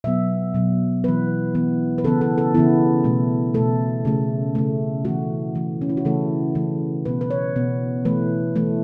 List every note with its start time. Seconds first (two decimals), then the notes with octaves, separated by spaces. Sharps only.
0.04 B2 F#3 B3 E5
0.54 B2 F#3 B3
1.04 E3 B3 B4
1.55 E3 B3
1.98 B4
2.04 C#3 E3 B3 A4
2.21 A4
2.38 A4
2.54 C#3 E3 B3 E4
3.04 B2 A3
3.54 B2 A3 A4
4.05 C#3 A3
4.55 C#3 A3
5.05 E3 A3 F#4
5.55 E3 A3
5.82 C#4
5.89 E4
5.97 F#4
6.05 C#3 E3 A3 A4
6.55 C#3 E3 A3
7.05 B2 B3 B4
7.21 B4
7.30 C#5
7.56 B2 B3
8.05 E3 A3 B4
8.56 E3 A3